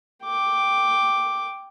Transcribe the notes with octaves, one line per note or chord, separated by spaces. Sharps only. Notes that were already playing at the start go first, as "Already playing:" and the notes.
G5 D6